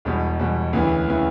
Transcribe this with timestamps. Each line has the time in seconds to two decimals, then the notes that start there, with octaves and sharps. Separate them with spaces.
0.05 E1 E2 B2 G3
0.39 E1 E2 B2 G3
0.73 D2 C#3 E3 B3 E4
1.08 C#3 E3 B3 E4